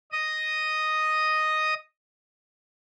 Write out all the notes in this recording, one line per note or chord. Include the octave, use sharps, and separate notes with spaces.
D#5 D#6